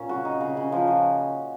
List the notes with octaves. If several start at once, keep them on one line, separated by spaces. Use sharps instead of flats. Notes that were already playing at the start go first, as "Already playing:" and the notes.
Already playing: A#2 C#4
C#3 F#4
D#4
C#3
C#3
F3
F3